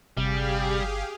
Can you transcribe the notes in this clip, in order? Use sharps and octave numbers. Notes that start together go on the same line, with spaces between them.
G1 C3 G3 G4 G#4 F5